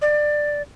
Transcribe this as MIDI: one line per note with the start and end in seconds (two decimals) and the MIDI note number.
0.02 0.62 74